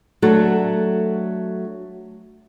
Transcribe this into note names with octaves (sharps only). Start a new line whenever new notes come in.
F#3 A3 D4 F#4 A4